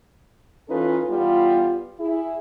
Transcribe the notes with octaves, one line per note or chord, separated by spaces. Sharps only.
E3 C#4 D#4 F4 A4 B4
E2 G3 B3 F4
E4 G#4